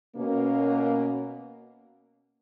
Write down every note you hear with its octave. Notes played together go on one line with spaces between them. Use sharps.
B2 A#3 C#4